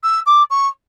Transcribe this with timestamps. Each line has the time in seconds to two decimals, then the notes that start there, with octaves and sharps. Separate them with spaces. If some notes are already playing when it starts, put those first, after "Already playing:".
0.04 E6
0.26 D6
0.50 C#6